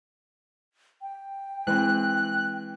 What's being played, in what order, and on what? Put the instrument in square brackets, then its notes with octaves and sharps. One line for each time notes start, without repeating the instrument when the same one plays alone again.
[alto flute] G5
[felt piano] E3 C4 [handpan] G#3 [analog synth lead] F#6